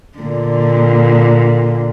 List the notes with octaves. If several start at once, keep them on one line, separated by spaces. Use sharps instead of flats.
A#2 D3